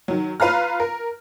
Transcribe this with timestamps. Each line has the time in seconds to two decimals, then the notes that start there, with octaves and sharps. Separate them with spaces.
0.08 D#3 F#3
0.40 F4 B4 F5 A#5 F6
0.80 A#4